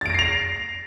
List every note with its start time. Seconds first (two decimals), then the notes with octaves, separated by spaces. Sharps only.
0.01 A6
0.06 D7
0.10 A#6
0.14 C7
0.19 F7